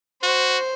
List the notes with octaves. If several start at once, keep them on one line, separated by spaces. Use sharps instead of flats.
F#4 C5